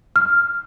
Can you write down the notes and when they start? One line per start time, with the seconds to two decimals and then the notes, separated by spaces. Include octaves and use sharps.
0.16 F6